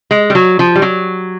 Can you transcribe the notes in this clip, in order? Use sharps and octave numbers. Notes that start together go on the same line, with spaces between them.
G#3
G3
F#3
F3
G3
F#3